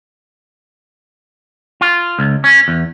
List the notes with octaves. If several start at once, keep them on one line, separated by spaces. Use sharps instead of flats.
F4
C#2
C#4
E2